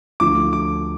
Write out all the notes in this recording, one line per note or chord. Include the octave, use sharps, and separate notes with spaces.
D2 D3 F3 D6
D6